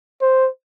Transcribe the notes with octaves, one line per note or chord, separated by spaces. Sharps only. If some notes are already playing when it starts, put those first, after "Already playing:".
C5